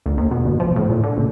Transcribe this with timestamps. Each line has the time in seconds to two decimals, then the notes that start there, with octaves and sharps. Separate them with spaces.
0.06 D2
0.18 D#2
0.31 B2
0.45 G1
0.60 F3
0.76 A2
0.89 A#2
1.03 D3
1.17 F#1